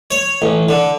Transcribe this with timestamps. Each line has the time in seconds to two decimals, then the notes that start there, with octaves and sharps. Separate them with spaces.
0.11 C#5
0.42 A1
0.69 D3